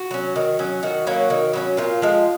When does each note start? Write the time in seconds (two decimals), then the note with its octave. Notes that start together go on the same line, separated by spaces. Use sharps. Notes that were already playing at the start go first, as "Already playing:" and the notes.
Already playing: F#4
0.11 F#3 C#4
0.36 D#3
0.59 F#3 C#4
0.83 D#3 F#4
1.07 F#3 A#3 C#4
1.30 D#3
1.53 F#3 A#3 C#4
1.77 A#2 F4
2.02 F3 G#3